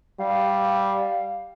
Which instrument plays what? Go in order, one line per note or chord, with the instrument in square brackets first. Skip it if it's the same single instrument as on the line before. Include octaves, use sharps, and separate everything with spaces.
[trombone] G3 [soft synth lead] F5